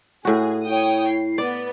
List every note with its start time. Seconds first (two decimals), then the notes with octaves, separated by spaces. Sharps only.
0.25 A2 F#4 G#4
0.65 E4 C#5 G5 D#6
1.08 C7
1.38 B3 D5